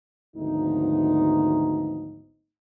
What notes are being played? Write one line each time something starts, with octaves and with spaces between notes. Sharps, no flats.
G#1 D2 F3 B3 D#4